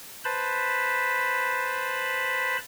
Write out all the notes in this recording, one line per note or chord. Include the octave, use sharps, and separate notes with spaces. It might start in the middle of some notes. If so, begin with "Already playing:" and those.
B4 C5 A5 B5